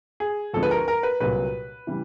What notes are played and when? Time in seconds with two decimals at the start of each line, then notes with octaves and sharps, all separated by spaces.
0.20 G#4
0.54 D2 D3 F3 G#3 A4
0.63 B4
0.71 A#4
0.88 A#4
1.03 B4
1.20 C2 A#2 F#3 B4
1.87 C#3 E3 G3